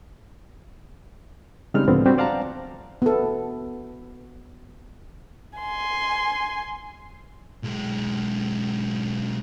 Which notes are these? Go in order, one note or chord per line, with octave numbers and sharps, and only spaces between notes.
C#3 G3 G#3 C4 D#4 F6
C#2 A2 D3 F3 B3 C4
G3 C4 F#4 G4
C5 D5 F5 F#5 A5 A#5
B3 A4
G#5 C6
B1 G#3